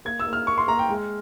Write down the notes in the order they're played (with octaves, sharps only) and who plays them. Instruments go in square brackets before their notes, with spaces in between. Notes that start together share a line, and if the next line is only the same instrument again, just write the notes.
[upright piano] A#3 G#6
E6
A#3
F6
A#3 C#6
C6
A#3 A#5
G5
G#3